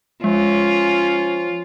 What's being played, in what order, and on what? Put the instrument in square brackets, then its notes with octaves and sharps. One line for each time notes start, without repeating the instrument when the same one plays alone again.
[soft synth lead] F3 [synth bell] G#3 [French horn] C#4 [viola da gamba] F4